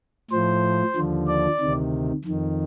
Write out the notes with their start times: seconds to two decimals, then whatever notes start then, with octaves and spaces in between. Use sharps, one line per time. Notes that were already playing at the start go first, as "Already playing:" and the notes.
0.30 A2 F3 C5
0.95 D#2 D3 F3
1.28 D5
1.60 D2 C3 D#3
2.25 F2 D#3